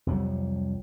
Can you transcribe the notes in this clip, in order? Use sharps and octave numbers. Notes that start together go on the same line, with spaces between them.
C2 F2 F#3 G3